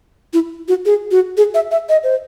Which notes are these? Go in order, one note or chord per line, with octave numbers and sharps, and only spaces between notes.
E4
F#4
G#4
F#4
G#4
E5
E5
D#5
C5